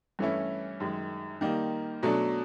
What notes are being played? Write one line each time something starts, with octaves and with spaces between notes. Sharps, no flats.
G2 E3 A3 C#4 E4
F#2 D#3 G#3
D#3 G3 A#3 D#4
B2 F#3 A3 D4